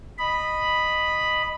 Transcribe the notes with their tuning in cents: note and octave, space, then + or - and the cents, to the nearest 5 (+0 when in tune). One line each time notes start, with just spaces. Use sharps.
D#5 -10 B5 +0